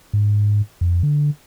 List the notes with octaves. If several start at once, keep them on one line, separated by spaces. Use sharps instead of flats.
G#2
F2
D3